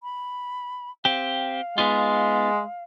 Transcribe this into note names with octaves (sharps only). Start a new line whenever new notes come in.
B5
C4 G4 F5
G#3 B3 D#4 F4